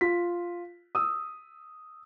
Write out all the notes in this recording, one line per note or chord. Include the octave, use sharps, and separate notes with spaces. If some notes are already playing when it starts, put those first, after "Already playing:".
F4 B6
D#6 E6